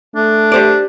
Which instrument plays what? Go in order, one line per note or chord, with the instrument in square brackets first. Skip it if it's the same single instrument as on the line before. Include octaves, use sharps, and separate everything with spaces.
[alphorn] A3 [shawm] D4
[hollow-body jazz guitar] G4 C5 D5